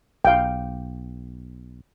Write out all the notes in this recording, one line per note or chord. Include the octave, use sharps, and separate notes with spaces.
B1 F5 G5